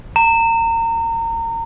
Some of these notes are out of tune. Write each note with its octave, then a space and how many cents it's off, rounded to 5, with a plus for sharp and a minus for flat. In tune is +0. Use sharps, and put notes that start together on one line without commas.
A#5 -30